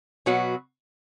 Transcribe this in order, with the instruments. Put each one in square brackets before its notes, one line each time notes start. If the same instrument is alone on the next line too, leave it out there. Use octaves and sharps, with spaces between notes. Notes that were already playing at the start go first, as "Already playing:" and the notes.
[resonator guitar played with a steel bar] B2 F#3 B3 F#4